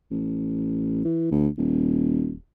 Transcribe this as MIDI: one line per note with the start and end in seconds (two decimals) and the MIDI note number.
0.11 1.02 33
1.05 1.30 52
1.31 1.48 38
1.57 2.34 27